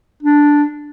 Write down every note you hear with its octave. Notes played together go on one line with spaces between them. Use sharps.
D4